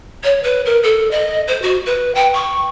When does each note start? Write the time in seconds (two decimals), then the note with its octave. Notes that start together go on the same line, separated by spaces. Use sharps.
0.23 C#5
0.43 B4
0.65 A#4
0.83 A4
1.11 D#5
1.47 C5
1.62 F#4
1.85 B4
2.15 G5
2.33 C#6